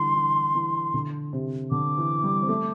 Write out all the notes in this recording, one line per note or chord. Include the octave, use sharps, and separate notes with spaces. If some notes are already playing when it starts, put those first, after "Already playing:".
Already playing: D3 E3 G3 C6
E3
E3
D3
C3
D3 D6
E3
G3
C4
A3